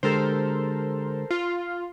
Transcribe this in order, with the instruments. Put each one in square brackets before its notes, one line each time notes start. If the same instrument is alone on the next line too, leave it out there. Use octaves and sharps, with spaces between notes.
[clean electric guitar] D3 G#3 G4 [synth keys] A4 A#4 C5
[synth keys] F4